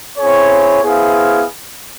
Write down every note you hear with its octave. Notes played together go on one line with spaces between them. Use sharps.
C4 E4 G#4 C#5
B3 E4 G#4 C5 F5